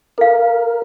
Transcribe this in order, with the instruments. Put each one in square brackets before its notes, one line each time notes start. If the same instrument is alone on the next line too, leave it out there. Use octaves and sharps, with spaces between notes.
[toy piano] A4 F5 [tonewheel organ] A#4